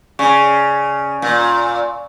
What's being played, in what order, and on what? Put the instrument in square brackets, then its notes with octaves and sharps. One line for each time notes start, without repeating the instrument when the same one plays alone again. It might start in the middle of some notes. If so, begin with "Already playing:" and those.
[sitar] C#3 [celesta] D5 G#5 C#6
[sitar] A#2